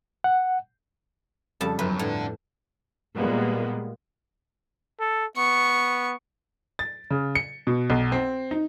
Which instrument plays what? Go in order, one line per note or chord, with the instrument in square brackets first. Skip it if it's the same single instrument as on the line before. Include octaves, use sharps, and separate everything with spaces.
[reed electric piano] F#5
[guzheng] F2 A5 [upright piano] C#3 G3 A4
[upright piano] G1 [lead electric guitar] F#2 [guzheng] B4
[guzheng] A2 [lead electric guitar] D4 A4
[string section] A#2 G3 G#3 A#3 B3
[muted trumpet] A4
[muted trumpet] B3 [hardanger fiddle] C#6
[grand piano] A6
C#3
C#7
B2
B1
C4
D#4